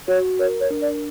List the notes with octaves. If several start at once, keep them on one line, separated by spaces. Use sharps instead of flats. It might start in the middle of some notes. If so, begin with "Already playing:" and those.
F#4 C#5
A#4 C#5
C#5
D4
D5